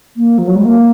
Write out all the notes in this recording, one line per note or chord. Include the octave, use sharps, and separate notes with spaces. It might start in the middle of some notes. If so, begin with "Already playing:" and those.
A#3
F3
F#3
G#3
A#3